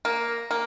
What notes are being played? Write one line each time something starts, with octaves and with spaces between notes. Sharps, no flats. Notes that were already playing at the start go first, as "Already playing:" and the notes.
A#3
A#3